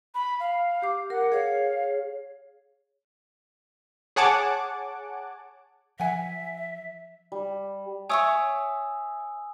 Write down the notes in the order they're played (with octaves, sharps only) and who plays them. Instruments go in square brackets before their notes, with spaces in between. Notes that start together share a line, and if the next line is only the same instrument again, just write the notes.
[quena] B5
F5
[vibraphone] G4 D6
[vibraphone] A#4 [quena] F#5
[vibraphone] G#4 C#5 [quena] F5
[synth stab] G#4 C#5 F#5 G#5 A5 D6
[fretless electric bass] F3 [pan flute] E5 [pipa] F#5 G#5
[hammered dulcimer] G3
[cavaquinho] C#5 E5 C#6 [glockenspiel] G#5 D#6 E6